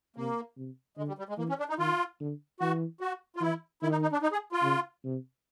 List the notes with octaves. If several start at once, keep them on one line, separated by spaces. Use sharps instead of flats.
C3 A#3
C3
D3 G#3
G3
G3
G#3
E3 A#3
C#4
D4
D#4
D#3 F4
D3
E3 F#4
F#4
F4
E3 E4
D#3 E4
D#4
D#4
D4
D#4
G#4
F4
C#3
C3